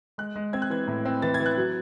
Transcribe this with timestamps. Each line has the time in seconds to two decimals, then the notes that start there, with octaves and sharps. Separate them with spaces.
0.18 G#3 F#6
0.36 G#3
0.53 C4 G#6
0.62 F#6
0.70 E3 G#6
0.87 A2
1.05 C4
1.22 E3 A6
1.34 G#6
1.40 E3
1.46 F#6
1.57 F#3